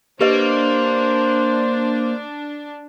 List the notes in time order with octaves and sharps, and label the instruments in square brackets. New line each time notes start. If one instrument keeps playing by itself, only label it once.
[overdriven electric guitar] A#3 [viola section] D4 [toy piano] G4 B4 D#5 [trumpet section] C5